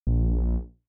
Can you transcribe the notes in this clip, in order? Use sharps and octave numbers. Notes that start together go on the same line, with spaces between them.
A#1